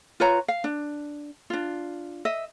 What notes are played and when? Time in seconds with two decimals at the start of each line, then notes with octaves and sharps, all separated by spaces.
0.20 F4 B4 C#5 A#5
0.48 F5
0.64 D4
1.50 D4 F4
2.25 D#5 E5